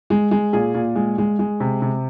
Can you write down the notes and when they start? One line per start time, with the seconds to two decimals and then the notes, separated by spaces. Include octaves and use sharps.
0.10 G#3
0.31 G#3
0.53 A#2 G#4
0.74 A#2
0.95 G#3
1.18 G#3
1.39 G#3
1.60 C3
1.82 C3